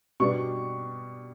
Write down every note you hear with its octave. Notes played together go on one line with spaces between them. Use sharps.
B2 G3 B3 D4 C#6